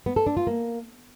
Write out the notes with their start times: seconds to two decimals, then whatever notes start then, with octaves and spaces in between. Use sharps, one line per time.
0.06 B3
0.16 A4
0.27 D4
0.37 F4
0.47 A#3